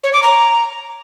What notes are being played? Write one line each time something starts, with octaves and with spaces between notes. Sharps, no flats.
C#5
D6
A#5